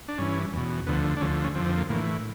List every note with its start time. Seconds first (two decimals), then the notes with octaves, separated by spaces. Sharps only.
0.08 D4
0.18 G2 E3 C#4
0.53 E2 B2
0.87 D2 D3 F3 B3
1.17 D4
1.21 D2 D3 F3 C#4
1.44 C#4
1.55 F2 D3 F3 C4
1.66 C4
1.78 A#3
1.89 A2 E3 A#3